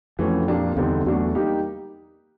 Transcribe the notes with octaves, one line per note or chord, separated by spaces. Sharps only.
F2 E3 A3 C#4 F#4
A#2 F3 A#3 D4 G4
E2 D3 G3 C4 D#4
E2 F#3 A3 D4 F#4
G3 A#3 D#4 G4